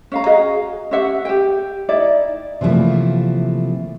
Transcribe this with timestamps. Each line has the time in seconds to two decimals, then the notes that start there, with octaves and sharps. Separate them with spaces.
0.12 C#4 F5 A#5
0.26 F#4 G#4 D#5 F5
0.91 C#4 G4 E5 F#5
1.25 G4 G5
1.89 D#4 E4 D5
2.61 C3 E3 F3 G3 A3 A#3